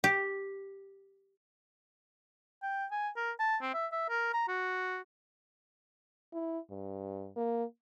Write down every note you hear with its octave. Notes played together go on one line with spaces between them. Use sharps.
G4
G5
G#5
A#4
A5
C4
E5
E5
A#4
A#5
F#4
E4
G2
A#3